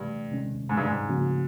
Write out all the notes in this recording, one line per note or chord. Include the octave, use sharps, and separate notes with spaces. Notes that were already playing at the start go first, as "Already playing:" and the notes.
Already playing: G2 C3 E3 A3
C3 D#3 G#3 C#4
G#2
G2
G#2
C#3 F3 A#3 C#4 F#4